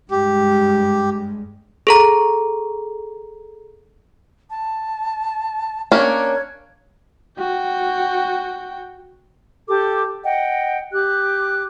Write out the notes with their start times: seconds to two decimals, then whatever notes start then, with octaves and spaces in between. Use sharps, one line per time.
0.11 G2 G#3 G4
1.87 G#4 A4 A#5
4.50 A5
5.92 A#3 C#4 D4 C#5
7.38 F#4 G5
9.67 G4 A4 D6
10.24 D#5 F#5 G5
10.92 G4 D6 F#6